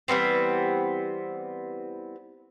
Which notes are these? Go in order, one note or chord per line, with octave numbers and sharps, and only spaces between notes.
E3 G3 B3 C4